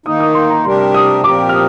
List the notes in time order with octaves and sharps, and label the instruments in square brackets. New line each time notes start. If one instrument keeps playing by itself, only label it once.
[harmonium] D#3 A#3 D#4 [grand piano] D#6
[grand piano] D#6
C6
A#5
[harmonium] C3 G3 D4 G4 A#4 [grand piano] C6
[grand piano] D#6
[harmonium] A#2 F3 C4 G4 A#4 [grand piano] D6
[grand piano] F6
D#6